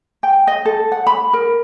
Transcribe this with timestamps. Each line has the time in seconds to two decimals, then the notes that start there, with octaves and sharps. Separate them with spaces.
0.23 G5
0.47 D#5
0.65 A4
0.92 F#5
1.07 B5
1.33 A#4